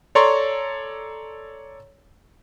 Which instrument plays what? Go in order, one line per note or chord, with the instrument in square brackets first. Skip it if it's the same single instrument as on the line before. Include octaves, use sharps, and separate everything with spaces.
[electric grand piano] A4 C#5 D5 A#5 C6 C#6